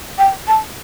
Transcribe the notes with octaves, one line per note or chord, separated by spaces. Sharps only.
G5
A5